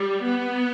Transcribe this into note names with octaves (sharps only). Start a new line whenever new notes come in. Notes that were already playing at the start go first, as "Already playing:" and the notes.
Already playing: G3
B3